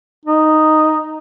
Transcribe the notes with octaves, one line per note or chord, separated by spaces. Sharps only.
D#4